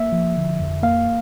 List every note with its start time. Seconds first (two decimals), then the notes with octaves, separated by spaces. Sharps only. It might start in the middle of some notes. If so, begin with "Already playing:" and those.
Already playing: A#3 E5
0.12 F3
0.37 D3
0.60 F2
0.83 A#3 F5